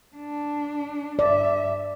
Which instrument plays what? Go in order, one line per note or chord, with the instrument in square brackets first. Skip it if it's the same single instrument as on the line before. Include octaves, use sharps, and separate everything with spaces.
[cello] D4
[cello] G2 E5 [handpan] D5